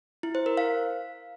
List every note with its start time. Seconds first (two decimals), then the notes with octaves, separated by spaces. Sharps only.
0.23 E4
0.35 C5
0.46 A#4
0.57 F5